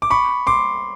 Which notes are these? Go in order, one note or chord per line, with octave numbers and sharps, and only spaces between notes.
D6
B5 C#6
C6 D6